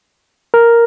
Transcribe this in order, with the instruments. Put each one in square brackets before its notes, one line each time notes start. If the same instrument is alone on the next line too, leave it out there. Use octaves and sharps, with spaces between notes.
[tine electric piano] A#4